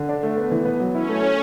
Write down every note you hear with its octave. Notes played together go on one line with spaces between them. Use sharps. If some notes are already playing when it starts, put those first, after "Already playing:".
Already playing: D3
D4
A3
B3
E3
B3
F#3
C#4 E4
A3
C#4